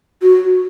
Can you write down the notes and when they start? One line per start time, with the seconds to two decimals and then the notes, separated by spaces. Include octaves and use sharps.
0.22 F#4